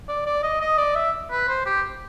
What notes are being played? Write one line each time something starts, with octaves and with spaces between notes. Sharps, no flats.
D5
D5
D#5
D#5
D5
E5
B4
C5
G4